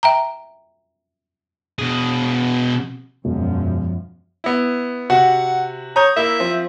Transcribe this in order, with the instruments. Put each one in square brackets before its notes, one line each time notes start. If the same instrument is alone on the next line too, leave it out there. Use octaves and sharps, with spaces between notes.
[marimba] E5 G5 A#5
[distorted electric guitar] B2 G#4
[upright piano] E1 [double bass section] F#2 F3
[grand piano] B3 E4
[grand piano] C3 F#4 [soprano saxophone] F#5
[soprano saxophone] C#5 [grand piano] A#5 D#6 G6
[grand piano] A#3 E4 [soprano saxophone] E5
[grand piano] F3 C4